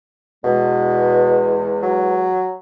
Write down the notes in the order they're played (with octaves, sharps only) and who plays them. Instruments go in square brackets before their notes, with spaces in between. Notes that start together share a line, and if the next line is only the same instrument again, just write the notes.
[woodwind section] E2 G#3 [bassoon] B2
[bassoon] F#3